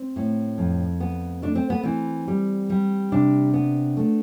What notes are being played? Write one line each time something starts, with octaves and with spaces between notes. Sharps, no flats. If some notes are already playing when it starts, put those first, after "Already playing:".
Already playing: C4
A2
F2
B3
A3 D4
C4
B3
E3 C4
G3
G3
C3 D4
B3
A3